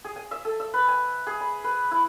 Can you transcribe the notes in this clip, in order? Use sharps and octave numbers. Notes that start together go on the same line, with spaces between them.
G#4
G#5
E5
A4
E5
B4
G#5
G#4
B5
B4
E4